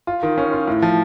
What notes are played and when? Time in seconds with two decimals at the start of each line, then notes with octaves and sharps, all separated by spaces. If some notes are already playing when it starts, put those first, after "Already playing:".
0.07 F4
0.23 D#3
0.38 C#4
0.52 F4
0.67 A2
0.82 F3